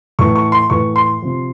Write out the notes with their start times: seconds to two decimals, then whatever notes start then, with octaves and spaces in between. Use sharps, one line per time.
0.19 A2 E3 C#6
0.36 C#6
0.52 C6
0.70 A2 E3 C#6
0.96 C6
1.22 C3 F3